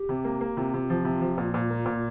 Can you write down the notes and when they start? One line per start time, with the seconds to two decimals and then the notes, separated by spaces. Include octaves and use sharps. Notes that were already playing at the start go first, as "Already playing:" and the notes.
Already playing: G4
0.09 C3
0.24 A#3
0.41 A#3
0.57 C3 F4
0.74 C3
0.90 F3
1.05 C3
1.21 F3
1.38 A#2
1.54 A#2
1.70 A#3
1.86 A#2